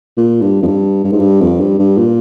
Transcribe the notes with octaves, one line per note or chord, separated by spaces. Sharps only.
A#2
G2
F2
G2
G2
G#2
G2
F2
G2
G2
A#2